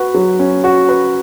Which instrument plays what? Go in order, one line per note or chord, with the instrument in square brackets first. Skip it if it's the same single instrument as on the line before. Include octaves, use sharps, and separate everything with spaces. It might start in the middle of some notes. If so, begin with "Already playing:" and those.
Already playing: [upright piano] F#4 B4
F#3
C#4
F#4
B4